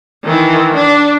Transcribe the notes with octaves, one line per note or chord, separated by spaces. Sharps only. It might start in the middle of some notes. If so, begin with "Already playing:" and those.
D#3 E3
D4